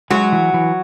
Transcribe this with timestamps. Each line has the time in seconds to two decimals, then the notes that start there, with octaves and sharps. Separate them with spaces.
0.10 F#3 G#3 F#4
0.32 E3
0.54 E3